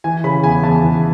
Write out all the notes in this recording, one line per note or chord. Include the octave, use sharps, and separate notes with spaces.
E3 G#5
C#3 B5
E2 G#5
E2 A5
E3